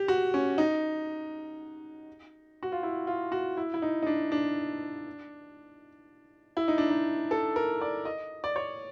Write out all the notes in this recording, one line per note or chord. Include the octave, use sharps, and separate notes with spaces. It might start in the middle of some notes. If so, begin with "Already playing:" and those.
Already playing: G4
F#4
C#4
D#4
F#4
F4
E4
F4
F#4
E4
E4
D#4
D#4
D4
D4
E4
D#4
D4
D#4
A4
A#4
D5
D#5
D5
C#5